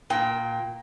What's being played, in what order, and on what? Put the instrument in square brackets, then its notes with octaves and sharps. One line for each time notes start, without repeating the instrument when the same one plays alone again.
[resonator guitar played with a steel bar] A#2 G5